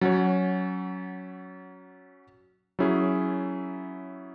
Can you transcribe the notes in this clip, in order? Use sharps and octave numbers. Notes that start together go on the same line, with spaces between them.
F#3 C#4 F#4 C#5
F#3 C#4 E4 G#4